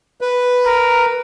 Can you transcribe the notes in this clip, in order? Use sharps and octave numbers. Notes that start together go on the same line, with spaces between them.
B4
A#4